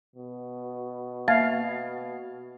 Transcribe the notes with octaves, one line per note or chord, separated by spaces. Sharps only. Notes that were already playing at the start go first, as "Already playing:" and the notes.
B2
A#3 E5 F5 G#6